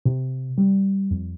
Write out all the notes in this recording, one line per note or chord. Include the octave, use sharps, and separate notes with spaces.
C3
G3
F2